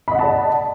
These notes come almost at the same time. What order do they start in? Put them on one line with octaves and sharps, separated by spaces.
B5 D#5 F#5 A5 D5